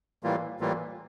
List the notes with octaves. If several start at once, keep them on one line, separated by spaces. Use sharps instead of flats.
A2 E3 G3 A#3 F4
A2 E3 G3 A#3 F4